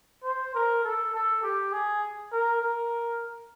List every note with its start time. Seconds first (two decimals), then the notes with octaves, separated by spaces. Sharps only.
0.24 C5
0.55 A#4
0.84 A4
1.14 A4
1.43 G4
1.72 G#4
2.32 A#4
2.62 A#4